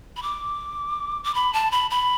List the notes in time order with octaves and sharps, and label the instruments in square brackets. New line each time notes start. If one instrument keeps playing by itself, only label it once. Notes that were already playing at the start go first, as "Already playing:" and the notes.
[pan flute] B5
D6
D6
B5
A5
B5
B5